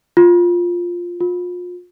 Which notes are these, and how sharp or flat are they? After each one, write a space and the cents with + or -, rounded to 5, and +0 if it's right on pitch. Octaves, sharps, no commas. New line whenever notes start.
F4 +5
F4 +35